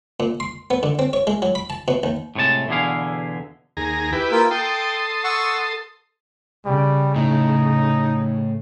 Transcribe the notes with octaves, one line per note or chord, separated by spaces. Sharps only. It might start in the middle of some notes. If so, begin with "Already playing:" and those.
A#2
C6
B3
D3
C4
C#5
G#3
F#3
B5
A5
B2
D#2
A2 C3 G#3 C#5 A5
E2 B2 D3 E4 G#4 F5
D#2 G#4 A#5
E4 G4 B4
A#3 F4
A4 G5 C6 D#6
F#5 C#6 E6
C#3 G3
A2 D#4